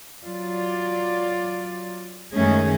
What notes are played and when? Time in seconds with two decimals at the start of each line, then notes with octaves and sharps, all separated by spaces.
0.24 F#3 F4 D5
2.34 F#2 D#3 G#3 A3 C#4 G#4